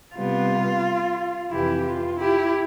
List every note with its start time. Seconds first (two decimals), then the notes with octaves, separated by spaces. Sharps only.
0.15 C3 G3 B3 F4
1.50 F2 C3 E3 E4 G4
1.85 F4
2.18 E4 G4